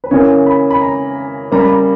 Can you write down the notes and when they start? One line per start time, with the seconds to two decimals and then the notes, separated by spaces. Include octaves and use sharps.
0.04 B4
0.11 C#3 E3 A#3 C#5
0.46 B5
0.70 B5
0.82 A#5
1.52 C#3 G3 A#3 A#5
1.60 B5
1.67 A#5